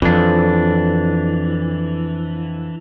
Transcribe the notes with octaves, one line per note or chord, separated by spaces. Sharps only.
F2 E3 D4